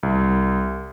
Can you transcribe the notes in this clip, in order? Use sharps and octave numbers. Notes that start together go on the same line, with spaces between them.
C2